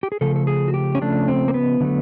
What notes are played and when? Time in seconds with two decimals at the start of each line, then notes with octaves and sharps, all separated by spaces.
0.03 G4
0.12 G#4
0.21 C#3 F3 A3 A4
0.36 A4
0.47 G#4
0.68 F#4
0.74 G4
0.95 C#4
1.01 C#3 F3 A3 D4
1.28 C4
1.48 A#3
1.54 B3
1.80 D3 F#3 A3